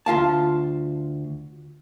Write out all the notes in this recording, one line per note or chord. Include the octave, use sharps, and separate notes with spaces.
D2 F4 F5 A5